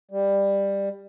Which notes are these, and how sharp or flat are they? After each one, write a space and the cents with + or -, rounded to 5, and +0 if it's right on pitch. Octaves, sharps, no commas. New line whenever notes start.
G3 +15